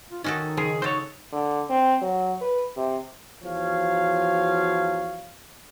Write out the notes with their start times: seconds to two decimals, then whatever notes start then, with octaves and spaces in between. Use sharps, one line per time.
0.10 F4
0.24 D#3 C#4 D#4 F#4 A4 D#6
0.57 C#3 F3 G#4
0.82 F#4 A4 C5 C#5
1.32 D3
1.70 C4
2.02 F#3
2.42 B4
2.77 C3
3.43 E2 F3 F#4 C#5 F5